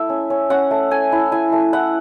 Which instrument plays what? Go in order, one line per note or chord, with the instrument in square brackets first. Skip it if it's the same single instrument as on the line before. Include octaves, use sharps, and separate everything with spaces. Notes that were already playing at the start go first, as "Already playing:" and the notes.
Already playing: [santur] A3 E4 E5
C#4
C#4
C#4 F#5
A3
A3 G#5
E4
E4 G#5
A3
E4 F#5